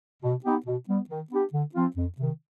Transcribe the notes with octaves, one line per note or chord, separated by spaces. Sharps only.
B2
B3 D#4 G4
B2
G3 B3
D#3
B3 D4 G4
D3
F3 C4 F4
F2
C3 D#3